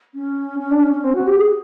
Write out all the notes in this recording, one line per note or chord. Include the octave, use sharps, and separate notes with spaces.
C#4
C#4
D4
C#4
C#4
C4
F#4
G4
G#4